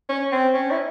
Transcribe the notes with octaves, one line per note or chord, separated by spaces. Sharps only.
C#4
C4
C#4
E4